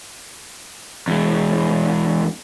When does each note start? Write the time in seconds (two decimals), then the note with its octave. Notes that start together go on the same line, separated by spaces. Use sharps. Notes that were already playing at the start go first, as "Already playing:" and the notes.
1.08 E2 G#3